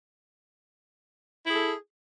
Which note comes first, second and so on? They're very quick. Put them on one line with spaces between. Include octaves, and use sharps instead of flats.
E4 G#4 A4